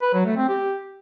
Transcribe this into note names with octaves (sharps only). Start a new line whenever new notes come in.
B4
F#3
A3
C4
G4